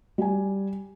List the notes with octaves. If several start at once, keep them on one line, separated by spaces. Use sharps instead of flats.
G3 G#5